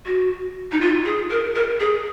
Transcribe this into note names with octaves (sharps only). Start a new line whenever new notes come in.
F#4
D#4
F4
G#4
A#4
A#4
G#4